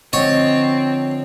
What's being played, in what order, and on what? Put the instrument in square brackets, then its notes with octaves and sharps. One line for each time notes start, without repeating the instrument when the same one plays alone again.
[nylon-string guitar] D3 F3 [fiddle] C4 [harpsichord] C#5 [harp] D#5 A6